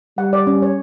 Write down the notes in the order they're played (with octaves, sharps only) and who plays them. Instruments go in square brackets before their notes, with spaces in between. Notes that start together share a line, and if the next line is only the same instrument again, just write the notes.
[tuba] G3 [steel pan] F#5
[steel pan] D5
C#4
C#5